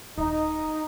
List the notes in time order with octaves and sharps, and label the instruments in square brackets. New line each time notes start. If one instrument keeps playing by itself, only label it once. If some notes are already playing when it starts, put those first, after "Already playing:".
[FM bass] D#1 [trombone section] D#4